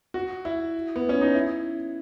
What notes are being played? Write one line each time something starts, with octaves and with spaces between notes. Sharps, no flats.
F#4
E4
B3
C#4
D#4
E4